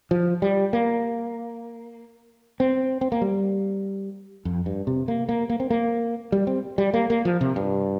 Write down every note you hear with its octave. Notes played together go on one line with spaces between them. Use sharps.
F3
G3
A#3
C4
C4
A#3
G3
F2
G2
C3
A#3
A#3
A#3
C4
A#3
G3
C4
G3
A#3
A#3
F3
C3
G2